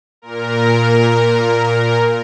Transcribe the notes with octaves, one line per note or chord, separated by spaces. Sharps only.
A#2 A#4